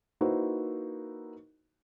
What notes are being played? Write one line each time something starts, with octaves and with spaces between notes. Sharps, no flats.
A#3 D#4 E4 F#4 B4 C5